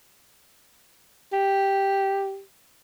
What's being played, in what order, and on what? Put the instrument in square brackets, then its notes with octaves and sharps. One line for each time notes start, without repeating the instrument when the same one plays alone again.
[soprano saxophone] G4